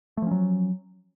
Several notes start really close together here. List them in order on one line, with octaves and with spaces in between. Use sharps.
A3 F3 C#4 F#3